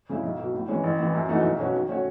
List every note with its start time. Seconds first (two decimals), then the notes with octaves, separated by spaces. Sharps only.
0.09 C#3 G#3 C#4 E4
0.23 B1
0.39 B2 F#3
0.54 A2
0.68 E3 G#3 C#4
0.84 A1
0.99 A2 E3
1.14 F#2
1.29 E3 A3 D#4 F#4
1.44 B1
1.58 B2 F#3 C#4 F#4
1.74 D#3
1.89 A3 C#4 F#4 C#5